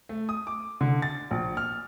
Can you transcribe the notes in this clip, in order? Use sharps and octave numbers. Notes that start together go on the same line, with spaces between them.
A3
D#6
D6
D3
A6
A#1
F6